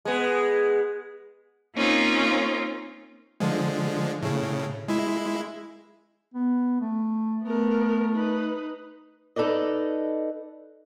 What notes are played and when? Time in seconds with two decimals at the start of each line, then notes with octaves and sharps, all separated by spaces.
0.05 G#3 B3
1.75 A#3 C4 C#4 D#4 F4
3.40 D3 F3 G#3
4.22 A2 C#3
4.88 G#3 E4
6.34 B3
6.81 A3
7.43 A3 B3 A#4
8.14 D#4 B4
9.36 D#4 A4 B4 D5 D#5